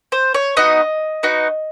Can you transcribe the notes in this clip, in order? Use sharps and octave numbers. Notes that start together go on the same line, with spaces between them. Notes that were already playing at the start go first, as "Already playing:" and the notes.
C5
C#5
B3 D#4 F#4 D#5
B3 D#4 F#4